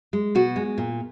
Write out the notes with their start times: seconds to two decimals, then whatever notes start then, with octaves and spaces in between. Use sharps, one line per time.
0.13 G#3
0.35 B2 F#4
0.56 G#3
0.78 A#2